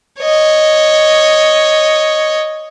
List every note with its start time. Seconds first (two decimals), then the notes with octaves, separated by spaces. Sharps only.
0.21 C#5 D#5